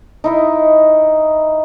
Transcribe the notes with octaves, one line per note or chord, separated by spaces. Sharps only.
D#4 E4 D#5